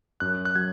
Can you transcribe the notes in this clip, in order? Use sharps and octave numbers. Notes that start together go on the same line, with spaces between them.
F#2 F#6
F#6
F#3 G#6